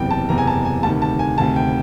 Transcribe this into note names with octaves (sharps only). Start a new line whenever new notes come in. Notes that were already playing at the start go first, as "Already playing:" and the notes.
Already playing: F#1 E2 C3 G5
A5
F#1 E2 C3 A#5
G#5
A5
G#5
D2 C3 D#3 A5
A5
G#5
D2 C3 D#3 A5
G5